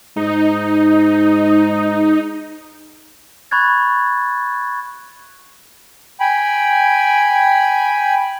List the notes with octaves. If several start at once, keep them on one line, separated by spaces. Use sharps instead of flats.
G#2 D#4
B5 C#6 F#6 G#6 A6
G5 G#5 B5